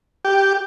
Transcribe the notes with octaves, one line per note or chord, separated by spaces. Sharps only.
G4